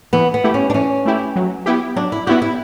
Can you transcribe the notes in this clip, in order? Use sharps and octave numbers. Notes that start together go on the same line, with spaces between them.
E3 B3
B3
A3 E4 G4
C#4
D4
E3 C#4
A3 E4 G4
F#3
B3 E4 G4
F#3 D4
E4
B3 E4 F#4 G4
E4